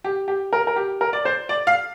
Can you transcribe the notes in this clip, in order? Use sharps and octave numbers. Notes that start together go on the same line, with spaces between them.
G4
G4
A#4
A#4
G4
A#4
D5
C5
D5
F5